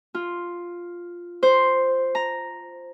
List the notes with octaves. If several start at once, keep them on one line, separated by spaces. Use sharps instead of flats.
F4
C5
A#5